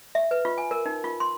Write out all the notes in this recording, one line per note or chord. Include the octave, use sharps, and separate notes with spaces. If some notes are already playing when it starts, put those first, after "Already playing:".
E5
B4
F4
G#5
A#4
D#4
F4
C6